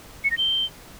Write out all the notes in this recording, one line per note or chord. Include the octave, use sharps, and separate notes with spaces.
C#7
A#6
G7